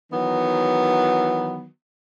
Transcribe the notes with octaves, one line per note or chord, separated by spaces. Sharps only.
D#3 E3 F#3 B3